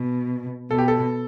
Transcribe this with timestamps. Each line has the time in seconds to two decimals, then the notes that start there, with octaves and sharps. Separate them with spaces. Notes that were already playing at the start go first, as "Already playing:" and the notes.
Already playing: B2
0.71 B2 A4
0.78 G4
0.88 A4